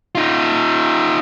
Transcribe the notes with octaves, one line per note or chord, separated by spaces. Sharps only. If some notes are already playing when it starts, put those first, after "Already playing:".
D#4 F4